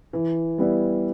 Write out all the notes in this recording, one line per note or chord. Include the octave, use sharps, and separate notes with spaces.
E3
G3 B3 E4